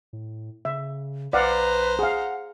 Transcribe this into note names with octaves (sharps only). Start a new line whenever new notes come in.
A2
C#3 E5
B1 B4 C5 D5 F5 F#5 A#5
G#4 F5 F#5